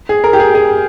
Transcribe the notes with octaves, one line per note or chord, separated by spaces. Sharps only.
G#4
A#4
G4
G#4
G#4